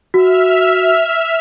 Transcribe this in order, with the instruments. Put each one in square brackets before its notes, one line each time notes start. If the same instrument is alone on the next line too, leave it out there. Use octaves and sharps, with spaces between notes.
[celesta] F#4 [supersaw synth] E5 F6